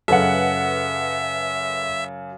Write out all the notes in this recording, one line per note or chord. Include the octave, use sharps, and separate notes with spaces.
F#2 C#3 A4 B4 E5 F#5